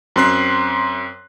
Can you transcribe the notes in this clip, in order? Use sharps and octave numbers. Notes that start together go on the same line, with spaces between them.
F#2 C4 C6 F#6 C7